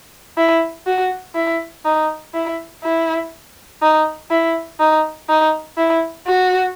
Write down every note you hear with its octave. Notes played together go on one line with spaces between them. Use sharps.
E4
F#4
E4
D#4
E4
E4
D#4
E4
D#4
D#4
E4
F#4